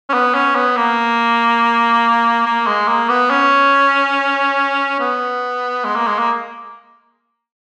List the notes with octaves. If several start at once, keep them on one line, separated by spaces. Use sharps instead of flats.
C#4
B3
C#4
B3
A#3
A#3
G#3
A#3
B3
C#4
B3
G#3
A#3
G#3
A#3